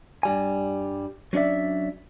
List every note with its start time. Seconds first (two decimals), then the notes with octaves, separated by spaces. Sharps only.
0.23 G2 G3 G#5
1.33 F#3 C#4 D4 D5 E5